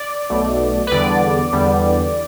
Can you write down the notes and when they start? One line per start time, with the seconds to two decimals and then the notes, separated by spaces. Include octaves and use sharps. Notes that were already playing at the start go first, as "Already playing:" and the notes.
Already playing: D5
0.30 B1 B2 A3
0.87 B4
0.91 E2 D3 G3 B3 D5
1.53 E2 D3 G3 B3